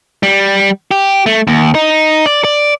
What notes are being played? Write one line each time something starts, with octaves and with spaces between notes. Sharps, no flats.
G3
G4
A3
D#2
D#4
D5
D5